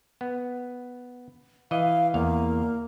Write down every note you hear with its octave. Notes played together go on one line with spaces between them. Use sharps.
B3
E3 D#5 F5
E2 A#3 F5